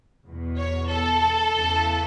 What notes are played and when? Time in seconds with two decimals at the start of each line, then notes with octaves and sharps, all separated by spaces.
0.25 E2 B2
0.57 C#5
0.88 A4
1.51 E2 C#3 E3